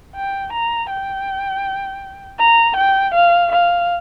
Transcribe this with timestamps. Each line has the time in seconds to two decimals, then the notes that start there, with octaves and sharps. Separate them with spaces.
0.16 G5
0.53 A#5
0.90 G5
2.39 A#5
2.77 G5
3.14 F5
3.52 F5